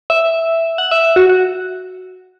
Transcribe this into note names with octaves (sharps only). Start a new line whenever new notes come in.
E5
F#5
E5
F#4
F#4